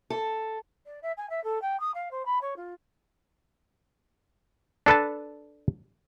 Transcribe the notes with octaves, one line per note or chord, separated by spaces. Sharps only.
A4
D5
E5
G#5
E5
A4
G5
D#6
F5
C5
B5
C#5
F4
D4 A4 B4 A5